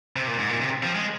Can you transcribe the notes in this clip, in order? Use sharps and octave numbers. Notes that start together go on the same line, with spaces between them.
C3
A#2
G#2
A#2
C3
F3
G#3